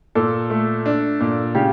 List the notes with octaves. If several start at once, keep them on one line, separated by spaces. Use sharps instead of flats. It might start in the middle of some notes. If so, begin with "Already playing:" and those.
A#2 A4
A3
D4
A#2
C#3 G4